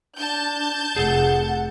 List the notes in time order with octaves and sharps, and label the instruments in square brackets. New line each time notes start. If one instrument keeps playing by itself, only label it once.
[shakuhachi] D4 [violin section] A5 G6
[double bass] F1 [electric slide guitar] G#4 A4 [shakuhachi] F#5